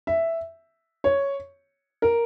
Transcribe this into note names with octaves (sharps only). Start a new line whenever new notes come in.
E5
C#5
A#4